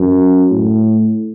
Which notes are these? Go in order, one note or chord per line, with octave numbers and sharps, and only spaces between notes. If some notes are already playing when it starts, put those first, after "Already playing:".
Already playing: F#2
A2